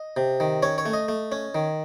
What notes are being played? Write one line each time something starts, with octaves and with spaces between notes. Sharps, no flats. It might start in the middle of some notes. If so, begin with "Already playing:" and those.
Already playing: D#5
C3
D#3
C#4 C#5
C#5
A3
D#5
A3
C#4
D#3